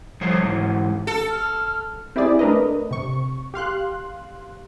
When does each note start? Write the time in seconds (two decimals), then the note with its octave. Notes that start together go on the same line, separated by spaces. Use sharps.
0.21 F3 G3 A3 C5 C#5
0.42 G#2 E3
1.07 A4
1.30 F6
2.16 C4 E4 G4 G#4 D5
2.39 A3 D4 A#4 B4 D#5
2.91 C3 C#6
3.54 G4 F5 C6 F#6